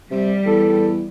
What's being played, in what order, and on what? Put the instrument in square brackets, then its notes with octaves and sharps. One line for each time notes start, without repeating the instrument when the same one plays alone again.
[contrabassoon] C3 [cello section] G3
[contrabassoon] E2 [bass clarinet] A4